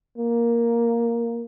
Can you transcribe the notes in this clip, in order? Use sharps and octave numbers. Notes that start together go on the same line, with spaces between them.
A#3